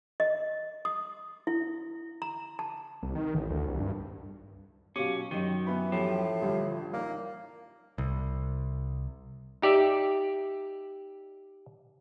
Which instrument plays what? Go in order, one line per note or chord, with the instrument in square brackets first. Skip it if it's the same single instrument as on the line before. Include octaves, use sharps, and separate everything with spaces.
[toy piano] D#5
D#6
E4
A#5
A5
[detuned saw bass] C2
D#3
A1
D2
C2
G2
[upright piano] B2 F#3 D6 [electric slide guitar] C#4 [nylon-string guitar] G4 C5 F5
[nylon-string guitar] F#2 F#3 C5 [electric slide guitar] D#3 [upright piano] G4 D#5
[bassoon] E3 [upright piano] B3 B5
[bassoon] A2 [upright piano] E3 G4 [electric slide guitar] F3
[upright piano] A1 F4 [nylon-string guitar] D3 G3
[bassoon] A#3 [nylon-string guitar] D#4 D5
[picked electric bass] C2
[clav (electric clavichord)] D#4 G4 D5 E5